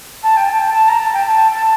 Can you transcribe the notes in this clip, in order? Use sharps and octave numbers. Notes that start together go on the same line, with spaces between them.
A5
G5
A5
A5
A5
A#5
A5
G5
A5
A5